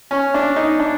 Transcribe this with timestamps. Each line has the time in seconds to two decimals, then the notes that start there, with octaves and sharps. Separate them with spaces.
0.11 C#4
0.34 D4
0.56 D#4
0.80 D4